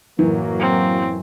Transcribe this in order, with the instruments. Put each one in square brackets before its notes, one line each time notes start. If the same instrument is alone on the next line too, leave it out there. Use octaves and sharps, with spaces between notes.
[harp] F#2 A2 [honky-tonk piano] E3 [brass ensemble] F#3 A#3
[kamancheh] C4